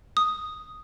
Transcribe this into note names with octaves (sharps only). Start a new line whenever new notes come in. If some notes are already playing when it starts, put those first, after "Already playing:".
D#6